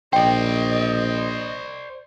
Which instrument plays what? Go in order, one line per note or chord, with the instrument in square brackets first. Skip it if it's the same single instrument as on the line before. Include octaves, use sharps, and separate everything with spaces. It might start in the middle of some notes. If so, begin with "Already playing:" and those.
[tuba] A#1 [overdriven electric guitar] C5 D5 [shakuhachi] D#5 [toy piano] G5